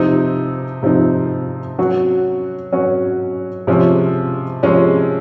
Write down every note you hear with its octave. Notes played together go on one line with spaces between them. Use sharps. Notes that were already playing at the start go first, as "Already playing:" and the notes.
Already playing: C3 F3 C4 D#4
C3 F3 C4 D#4
F#3 C#4 F#4
F#3 C#4 F#4
C3 F3 G#3 C#4
C3 F3 G#3 C#4